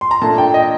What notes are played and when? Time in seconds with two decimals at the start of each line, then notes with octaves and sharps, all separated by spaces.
0.01 C6
0.11 A#5
0.22 A#2 A3 D4 A5
0.38 G5
0.54 D#5